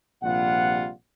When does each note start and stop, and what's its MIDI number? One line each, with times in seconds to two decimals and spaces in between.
0.22 0.89 34
0.22 0.89 48
0.22 0.89 55
0.22 0.89 65
0.22 0.89 78